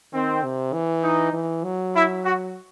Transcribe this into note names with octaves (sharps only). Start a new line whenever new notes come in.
D#3 C4
C3
E3
D#4
E3
F#3
E4
F#4